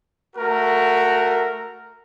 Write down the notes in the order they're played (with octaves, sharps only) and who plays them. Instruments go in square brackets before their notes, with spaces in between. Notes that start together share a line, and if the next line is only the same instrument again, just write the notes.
[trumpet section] A3 F#4 A#4